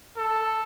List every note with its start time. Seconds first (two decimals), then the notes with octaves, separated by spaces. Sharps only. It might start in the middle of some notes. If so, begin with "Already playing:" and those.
0.17 A4